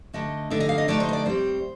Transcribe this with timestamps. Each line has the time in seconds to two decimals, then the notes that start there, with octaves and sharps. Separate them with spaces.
0.14 D3 A3 D#4 D#5
0.50 D3 A3 D#4 D5
0.60 D#5
0.69 F5
0.78 D#5
0.88 D3 A3 D#4 D5
1.00 C5
1.09 D#5
1.13 D5
1.25 A2 G3 C4 C5